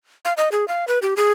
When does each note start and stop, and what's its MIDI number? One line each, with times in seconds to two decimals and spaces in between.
0.25 0.33 77
0.37 0.49 75
0.52 0.67 68
0.68 0.85 77
0.88 0.99 71
1.02 1.14 67
1.17 1.32 68